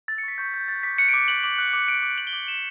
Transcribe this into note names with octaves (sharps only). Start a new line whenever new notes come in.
E6 A6
C#7
C#6 B6
C#6 G6
G6
F#6 A6
D6 B6
F#6 C#7
D7
D6
F#6 F#7
D6 F#7
F#6
D6
F#6 D7
D6
F#6 F#7
G7
D6 F#7
F#6 E7